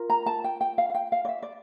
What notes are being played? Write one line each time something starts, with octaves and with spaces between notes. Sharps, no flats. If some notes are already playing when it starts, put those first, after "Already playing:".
Already playing: F4 A#4
A#5
A5
G5
G5
F5
F5
G5
F5
D5
E5
D5